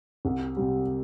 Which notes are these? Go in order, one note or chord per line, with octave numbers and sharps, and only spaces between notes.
C2
C3 G3